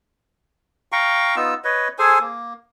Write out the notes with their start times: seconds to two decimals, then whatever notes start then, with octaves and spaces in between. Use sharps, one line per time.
0.92 F5 G5 A#5 C#6
1.36 B3 D#4 F4 E6
1.64 B4 C#5 D#5
1.99 G#4 A4 C5 G#5
2.21 A#3